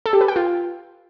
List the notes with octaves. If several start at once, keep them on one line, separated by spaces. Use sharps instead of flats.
A4
G4
B4
G5
F4